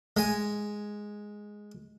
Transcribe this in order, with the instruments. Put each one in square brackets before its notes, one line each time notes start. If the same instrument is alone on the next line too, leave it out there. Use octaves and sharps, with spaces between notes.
[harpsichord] G#3 G#5